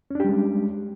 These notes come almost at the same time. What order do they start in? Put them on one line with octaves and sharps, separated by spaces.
C#4 D4 G4 G3 G#3